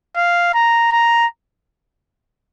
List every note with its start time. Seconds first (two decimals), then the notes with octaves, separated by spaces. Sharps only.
0.16 F5
0.54 A#5
0.92 A#5